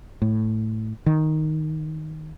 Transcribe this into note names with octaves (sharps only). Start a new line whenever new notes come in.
A2
D#3